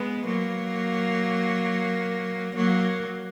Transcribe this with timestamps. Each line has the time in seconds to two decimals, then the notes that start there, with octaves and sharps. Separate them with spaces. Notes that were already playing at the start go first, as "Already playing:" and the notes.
Already playing: G#3 B3
0.26 F#3 A#3
2.56 F#3 A#3